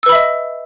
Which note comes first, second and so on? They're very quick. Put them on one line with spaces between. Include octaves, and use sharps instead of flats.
E6 B4 B5 E5 D#5